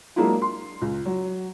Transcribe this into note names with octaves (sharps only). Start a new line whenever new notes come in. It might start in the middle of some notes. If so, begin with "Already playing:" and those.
F#3 G#3 A#3 D4 E4 F4
C6
C#2
F#3